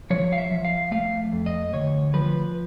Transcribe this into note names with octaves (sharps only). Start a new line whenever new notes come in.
F3 C#5
F5
E5
F3
F5
A3 F5
F2
D#5
D2 C#5
F3 B4